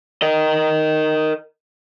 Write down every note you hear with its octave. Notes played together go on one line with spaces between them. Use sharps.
A#4 D#5